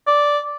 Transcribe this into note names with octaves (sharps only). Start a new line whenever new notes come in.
D5